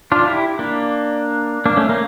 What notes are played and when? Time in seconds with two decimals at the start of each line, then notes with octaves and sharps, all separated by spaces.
0.12 D4 F4
0.28 E4 G4
0.59 A#3 D4
1.66 A#3 D4
1.76 A3 C#4
1.89 A#3